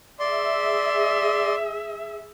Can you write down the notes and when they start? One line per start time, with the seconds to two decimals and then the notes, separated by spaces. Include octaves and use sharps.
0.19 G#4 D5 E5 C6